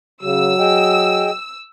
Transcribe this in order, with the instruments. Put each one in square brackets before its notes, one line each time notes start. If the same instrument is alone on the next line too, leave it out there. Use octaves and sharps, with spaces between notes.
[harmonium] C#3 [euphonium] F#3 [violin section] E6
[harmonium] G#4 D#5 G5